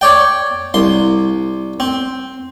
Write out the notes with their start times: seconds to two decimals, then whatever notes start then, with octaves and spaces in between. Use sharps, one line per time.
0.01 C#5 D5 G5
0.74 C2 C6
1.80 C4